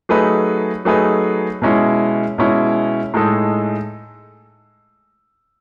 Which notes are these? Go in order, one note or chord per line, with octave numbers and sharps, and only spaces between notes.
F#3 A3 D#4 G#4 B4
F#3 A3 D#4 G#4 B4
B2 G#3 C#4 E4
B2 G#3 C#4 E4
A2 G#3 D#4 A4